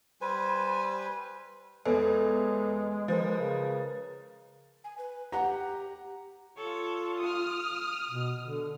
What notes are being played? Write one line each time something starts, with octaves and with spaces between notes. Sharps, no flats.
G3 B4 C5 G#5
E2 G#3 A4 B4 C#5
F3 A#4 B4
C#3
G#5
B4
G4 F#5 A#5
F4 A4 C#5
D#6 F6
B2
D3